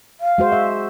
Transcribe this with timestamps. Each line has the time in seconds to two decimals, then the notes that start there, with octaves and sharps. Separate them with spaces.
0.20 F5
0.38 G#3 F#4 C5
0.52 E5